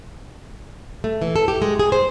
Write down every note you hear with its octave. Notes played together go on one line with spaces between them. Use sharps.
A3
E3
A4
G4
G#3
G#4
C5